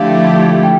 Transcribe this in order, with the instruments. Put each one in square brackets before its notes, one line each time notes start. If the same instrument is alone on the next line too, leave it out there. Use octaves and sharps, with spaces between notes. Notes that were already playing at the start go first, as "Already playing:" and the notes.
Already playing: [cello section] D3 F3 A3 E4 G4 [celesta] F5
[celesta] G5